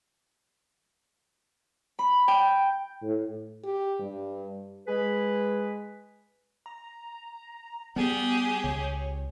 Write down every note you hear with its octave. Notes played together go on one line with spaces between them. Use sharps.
B5
G5
A2
G4
G2
G#3 G#4 B4
A#5
G3 B3 G4 G#4
C#2 C#5